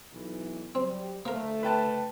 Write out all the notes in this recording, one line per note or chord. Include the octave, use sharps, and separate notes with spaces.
B1 E3
F#3 G3 C4
D2 A3 A#3 A#4
B4 G5 A5